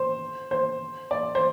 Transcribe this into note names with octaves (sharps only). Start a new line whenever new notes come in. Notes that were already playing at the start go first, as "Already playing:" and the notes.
Already playing: C5
C5
D5
C5